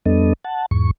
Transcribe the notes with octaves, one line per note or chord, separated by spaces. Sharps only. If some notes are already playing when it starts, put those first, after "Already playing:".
F2 G3 B3 D4 A4 D#5
F#5 A5
E2 G#2 C#6